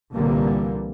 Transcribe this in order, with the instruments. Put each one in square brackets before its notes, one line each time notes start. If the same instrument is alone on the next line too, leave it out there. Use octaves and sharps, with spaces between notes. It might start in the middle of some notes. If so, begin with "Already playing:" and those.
[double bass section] C2 A#2 D3 E3 G3 A#3